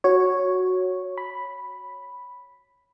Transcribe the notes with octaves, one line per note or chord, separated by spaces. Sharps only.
F#4 C#5
B5